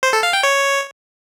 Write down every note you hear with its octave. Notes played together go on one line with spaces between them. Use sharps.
C5
A4
F5
G5
C#5